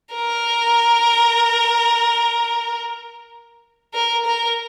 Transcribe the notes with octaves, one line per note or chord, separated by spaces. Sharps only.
A#4
A#4
A#4